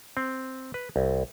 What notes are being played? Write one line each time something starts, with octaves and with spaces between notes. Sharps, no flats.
C4
B4
C2